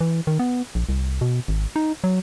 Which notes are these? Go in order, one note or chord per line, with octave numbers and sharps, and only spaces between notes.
E3
D#3
B3
A#1
C2
B2
G#1
D#4
F#3